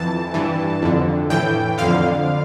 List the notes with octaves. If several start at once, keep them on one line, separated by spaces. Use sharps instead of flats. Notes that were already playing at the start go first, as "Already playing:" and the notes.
Already playing: F2 E3 A5
G2 E3
F2 D3
A2 E3 G5
F2 D3 F5